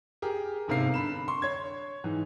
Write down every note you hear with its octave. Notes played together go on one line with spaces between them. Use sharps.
G4 G#4 A#4
G1 G#2 C3 A#4 F5 C7
D3 B5 E7
C6 C#6
C#5 G#6
G#2 E3